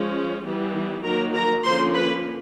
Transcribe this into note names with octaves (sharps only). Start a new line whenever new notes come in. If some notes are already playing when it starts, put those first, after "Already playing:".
Already playing: F3 G#3 C#4
E3 G3 B3
D#3 F#3 A#3 A#4 A#5
A#4 A#5
D3 F3 A#3 C#4 C5 C6
B4 B5